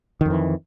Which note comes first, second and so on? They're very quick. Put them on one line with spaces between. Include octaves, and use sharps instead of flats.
D#3 F2 E3